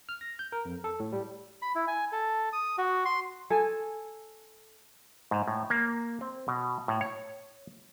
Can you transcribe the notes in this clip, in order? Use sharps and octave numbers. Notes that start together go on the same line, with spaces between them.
F6
A#6
G6
A#4
F2
A4
A2
G3
B5
E4
G#5
A4
D#6
F#4
C6
A4 G#5
G#2
A2
A#3
C4
B2
A2
C#5